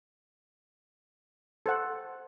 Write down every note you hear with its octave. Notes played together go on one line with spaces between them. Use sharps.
A4 C5 F#5